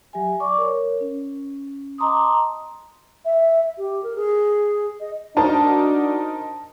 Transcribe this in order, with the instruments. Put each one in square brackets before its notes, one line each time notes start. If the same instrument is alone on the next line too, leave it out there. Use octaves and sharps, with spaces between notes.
[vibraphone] F#3 G4 E5 G#5
D5 C#6 D6
A#4 C#5
C#4
D#5 A5 A#5 C6 D6 D#6
[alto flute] E5
G4
A#4
G#4
D#5
[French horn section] D4 F#4 [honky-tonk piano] D#4 A#4 C5 [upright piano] A5